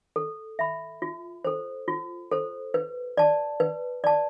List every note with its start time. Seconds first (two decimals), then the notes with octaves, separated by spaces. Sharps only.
0.16 A4
0.59 E5 B5
1.02 F4
1.44 A4 C5
1.88 F4
2.31 A4 C5
2.74 B4
3.17 D5 A5
3.60 B4
4.04 D5 A5